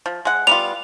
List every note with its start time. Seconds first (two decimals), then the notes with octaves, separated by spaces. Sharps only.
0.06 F3
0.25 G#3 F#5
0.47 G3 B3 F4 F7